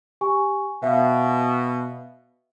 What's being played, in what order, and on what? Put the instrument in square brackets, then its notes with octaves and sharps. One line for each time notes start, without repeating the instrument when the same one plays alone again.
[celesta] G4 G#5 C#6
[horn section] B2 [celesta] E5 F5